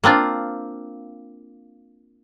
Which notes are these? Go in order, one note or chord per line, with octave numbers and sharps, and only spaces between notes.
A#3 C4 D4 F4